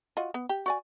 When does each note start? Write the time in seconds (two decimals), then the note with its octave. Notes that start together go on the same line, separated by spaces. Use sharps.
0.17 F4 F#4 D#5
0.34 B3
0.49 G4
0.66 F#4 D5 G#5